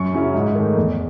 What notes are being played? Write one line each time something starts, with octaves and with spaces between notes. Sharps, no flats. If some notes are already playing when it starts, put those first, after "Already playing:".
Already playing: F#2 C#6
C#3 F#3 C#4 E4
G#2
D#3 A3
E2